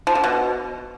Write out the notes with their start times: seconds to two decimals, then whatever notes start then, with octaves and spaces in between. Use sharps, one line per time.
0.07 F3
0.15 D3
0.24 B2